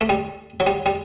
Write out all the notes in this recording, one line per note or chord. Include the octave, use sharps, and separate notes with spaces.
A3
G3
F#3
G3
G3